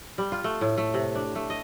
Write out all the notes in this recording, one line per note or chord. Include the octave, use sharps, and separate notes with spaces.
G3
F4
A3
A2
A3
C3
D4
A3
D#5